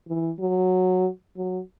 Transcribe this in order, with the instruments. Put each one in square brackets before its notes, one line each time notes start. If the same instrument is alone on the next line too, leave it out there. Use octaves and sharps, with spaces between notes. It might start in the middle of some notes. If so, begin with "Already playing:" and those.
[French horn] E3
F#3
F#3